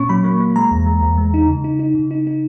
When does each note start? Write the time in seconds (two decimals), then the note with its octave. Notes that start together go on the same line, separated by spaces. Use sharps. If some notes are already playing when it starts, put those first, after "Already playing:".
Already playing: A#2 A#3 C#4 C#6
0.09 F#3 B5
0.24 A#3
0.40 A#3
0.56 G#3 A#5
0.71 E2
0.86 G#3
1.02 E2
1.18 G#3
1.34 D#4
1.48 C#3
1.64 D#4
1.79 D#4
1.95 C#3
2.11 D#4
2.27 D#4